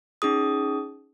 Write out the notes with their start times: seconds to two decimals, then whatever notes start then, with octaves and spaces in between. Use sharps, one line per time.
0.22 C#4 D#4 G#4 D#6